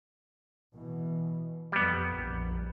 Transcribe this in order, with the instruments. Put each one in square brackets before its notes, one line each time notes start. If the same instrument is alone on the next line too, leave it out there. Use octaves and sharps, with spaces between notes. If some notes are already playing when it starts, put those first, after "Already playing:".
[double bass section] B2 E3
[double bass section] F2 [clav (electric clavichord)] G3 B3
[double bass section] A#1